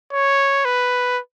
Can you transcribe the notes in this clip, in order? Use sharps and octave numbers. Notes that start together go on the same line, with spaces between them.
C#5
B4